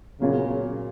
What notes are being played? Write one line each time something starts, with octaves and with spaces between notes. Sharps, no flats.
A#2 C#3 F#3 A#3